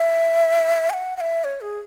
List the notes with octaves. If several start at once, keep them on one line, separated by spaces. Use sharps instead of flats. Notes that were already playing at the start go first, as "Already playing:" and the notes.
Already playing: E5
G#5
F#5
F#5
E5
C#5
G#4